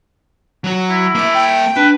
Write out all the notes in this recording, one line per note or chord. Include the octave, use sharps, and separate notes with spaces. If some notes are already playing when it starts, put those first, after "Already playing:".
F#3 F#4
E4
A#3 E5 D6
G5
D4 B4